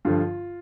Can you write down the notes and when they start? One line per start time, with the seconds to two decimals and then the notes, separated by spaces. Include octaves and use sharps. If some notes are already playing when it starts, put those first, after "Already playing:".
0.05 G2 D3 F3 F4